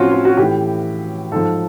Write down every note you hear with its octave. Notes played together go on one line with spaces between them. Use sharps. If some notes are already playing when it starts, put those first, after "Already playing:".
Already playing: A2 F3 C4 C#4 F4 F#4
F4
F#4
A2 E3 G4
G#2 F3 A4